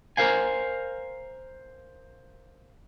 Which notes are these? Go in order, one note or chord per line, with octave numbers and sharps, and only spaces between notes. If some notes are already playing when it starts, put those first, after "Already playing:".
A#4 C5 F5 G#5